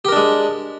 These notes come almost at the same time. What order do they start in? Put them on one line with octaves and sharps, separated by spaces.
G4 A#4 D4 G#3